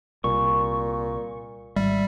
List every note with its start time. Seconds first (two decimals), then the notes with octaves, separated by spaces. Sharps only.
0.24 C2 A#2 C#6
1.76 G#1 G3 E5